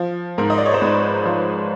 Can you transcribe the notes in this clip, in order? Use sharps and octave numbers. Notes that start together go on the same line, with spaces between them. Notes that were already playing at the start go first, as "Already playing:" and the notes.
Already playing: F3
G#2 A#4
D#5
D5
C#5
C5
G#2 B4
F3